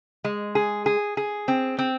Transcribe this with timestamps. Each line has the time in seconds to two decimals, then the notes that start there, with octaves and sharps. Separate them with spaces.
0.24 G#3
0.55 G#4
0.86 G#4
1.17 G#4
1.48 C4
1.78 C4